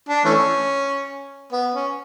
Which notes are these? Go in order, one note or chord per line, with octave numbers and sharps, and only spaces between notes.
D4
E3 A3 C#4
B3
C#4